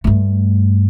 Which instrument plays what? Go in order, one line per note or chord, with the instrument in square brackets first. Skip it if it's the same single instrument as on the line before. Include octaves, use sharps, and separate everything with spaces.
[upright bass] G2 A3